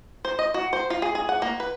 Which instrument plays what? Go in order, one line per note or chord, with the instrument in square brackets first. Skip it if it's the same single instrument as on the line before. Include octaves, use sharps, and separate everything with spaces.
[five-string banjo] C5
D#5
F#4
C5
F4
G#4
G#4
F#5
A#3
B4